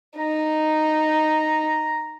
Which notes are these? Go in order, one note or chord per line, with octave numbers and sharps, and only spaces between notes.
D#4 A#5